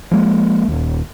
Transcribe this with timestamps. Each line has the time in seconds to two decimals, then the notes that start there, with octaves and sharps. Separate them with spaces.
0.11 F3 G#3 A#3
0.68 D#1 D#2